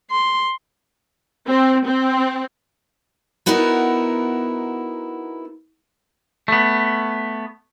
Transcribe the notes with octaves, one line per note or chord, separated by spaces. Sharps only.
C6
C4
C4
B3 D#4 E4 F#4 A#4
A3 B3